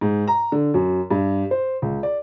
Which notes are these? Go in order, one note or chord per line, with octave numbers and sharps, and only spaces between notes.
G#2
A#5
D3
F#2
G2
C5
C#2
D5